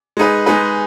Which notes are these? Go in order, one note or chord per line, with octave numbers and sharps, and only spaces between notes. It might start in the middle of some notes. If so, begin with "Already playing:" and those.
G#3 D#4 G#4 B4
G#3 D#4 G#4 B4